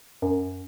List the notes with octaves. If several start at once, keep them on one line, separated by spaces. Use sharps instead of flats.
F#2